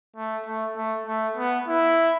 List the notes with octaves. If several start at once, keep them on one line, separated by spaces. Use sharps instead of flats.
A3
A3
A3
A3
B3
E4